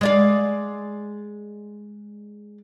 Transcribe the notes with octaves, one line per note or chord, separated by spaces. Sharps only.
G#3 D5 F5